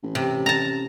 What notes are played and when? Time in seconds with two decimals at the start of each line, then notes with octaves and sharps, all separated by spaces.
0.03 A1
0.15 C3
0.46 A5 A#5